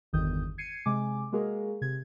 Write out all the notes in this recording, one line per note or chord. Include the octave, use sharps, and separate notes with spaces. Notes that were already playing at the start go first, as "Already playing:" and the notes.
G1 E2 D#3 D#6 G6
G#6 C7 C#7 D#7
C3 G#3 G#5 D6
G#3 A#3 F#4 G#4 A#4
C3 G#6